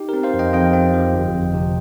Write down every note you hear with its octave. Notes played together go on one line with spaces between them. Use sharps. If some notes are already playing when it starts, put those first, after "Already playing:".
Already playing: D#4 G4
C4 A#4
C5 F5
F2
D#5 G5
F2 D#5 G5
C4
F3
G1
F2
C3